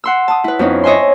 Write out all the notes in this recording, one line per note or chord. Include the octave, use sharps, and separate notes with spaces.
F#5 C6 E6
A5 D#6
E4 B4
F2 B3 C#4 D#4 E4
C#5 D#5 E5 G#5 C6